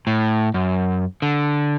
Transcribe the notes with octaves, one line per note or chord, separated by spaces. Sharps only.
A2
F#2
D3